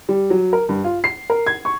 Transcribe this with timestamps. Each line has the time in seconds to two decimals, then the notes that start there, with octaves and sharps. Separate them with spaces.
0.09 G3
0.30 F#3
0.53 A#4
0.69 G2
0.84 F4
1.04 C7
1.30 A#4
1.46 G#6
1.65 C#6